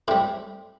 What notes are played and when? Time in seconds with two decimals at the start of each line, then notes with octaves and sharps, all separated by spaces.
0.08 A2 G3 C4 E4